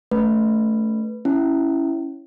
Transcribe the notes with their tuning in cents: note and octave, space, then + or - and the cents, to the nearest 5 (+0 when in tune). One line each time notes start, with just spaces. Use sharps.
A3 +0 C#4 +30 B4 +0
C#4 +0 E4 +0